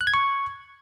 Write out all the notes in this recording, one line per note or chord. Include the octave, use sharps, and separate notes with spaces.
F#6
G#6
C#6